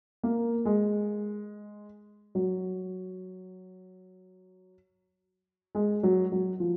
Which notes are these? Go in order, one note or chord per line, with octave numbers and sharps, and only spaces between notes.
A#3
G#3
F#3
G#3
F#3
F#3
F3